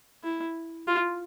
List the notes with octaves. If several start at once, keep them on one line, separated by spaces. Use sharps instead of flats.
E4
F4